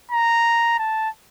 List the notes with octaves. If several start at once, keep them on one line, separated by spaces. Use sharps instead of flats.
A#5
A5